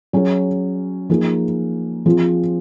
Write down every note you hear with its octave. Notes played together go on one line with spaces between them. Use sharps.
F#3 C#4 G#4
F3 A#3 D#4 G#4
F3 C4 F4 G#4